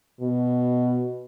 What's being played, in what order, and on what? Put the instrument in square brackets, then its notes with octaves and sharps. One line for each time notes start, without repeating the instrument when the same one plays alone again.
[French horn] B2